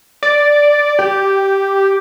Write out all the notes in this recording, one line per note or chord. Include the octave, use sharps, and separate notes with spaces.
D5
G4